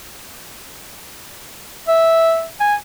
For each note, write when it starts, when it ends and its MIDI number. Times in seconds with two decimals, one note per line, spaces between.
1.88 2.46 76
2.60 2.75 80